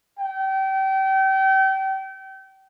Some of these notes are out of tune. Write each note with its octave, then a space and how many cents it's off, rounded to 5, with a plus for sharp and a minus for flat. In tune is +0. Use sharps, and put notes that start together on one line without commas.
G5 -30